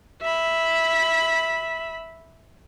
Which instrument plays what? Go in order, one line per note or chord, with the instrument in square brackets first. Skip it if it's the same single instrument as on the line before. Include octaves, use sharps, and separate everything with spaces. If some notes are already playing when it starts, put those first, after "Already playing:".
[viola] E5 B5